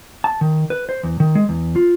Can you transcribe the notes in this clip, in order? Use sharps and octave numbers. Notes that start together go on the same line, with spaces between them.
A5
D#3
B4
C5
E2
D#3
G#3
E2
F4